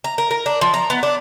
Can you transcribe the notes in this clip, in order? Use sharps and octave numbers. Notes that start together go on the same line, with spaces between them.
A#5
A#4
A#4
D4
F3
A#5
B3
D4